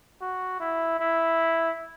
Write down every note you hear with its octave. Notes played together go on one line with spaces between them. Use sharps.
F#4
E4
E4